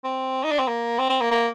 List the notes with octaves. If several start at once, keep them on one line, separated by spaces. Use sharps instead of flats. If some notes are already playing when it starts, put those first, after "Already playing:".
C4
D#4
D4
C4
A#3
C4
C4
A#3
A#3